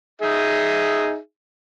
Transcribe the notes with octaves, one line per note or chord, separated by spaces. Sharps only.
D#4 G#4 E5